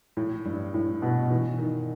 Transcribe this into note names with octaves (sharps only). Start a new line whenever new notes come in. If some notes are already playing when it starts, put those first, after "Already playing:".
A2
G2
A2
B2
E3
D#3